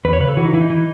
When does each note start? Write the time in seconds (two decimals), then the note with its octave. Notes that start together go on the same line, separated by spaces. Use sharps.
0.05 E2 B4
0.13 C#5
0.20 C#3 B4
0.29 A4
0.37 E3 F#4
0.45 D#4
0.53 E3 E4
0.61 D#4
0.70 E3